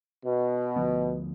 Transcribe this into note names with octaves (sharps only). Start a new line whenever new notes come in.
B2
D2 D3 F3 B3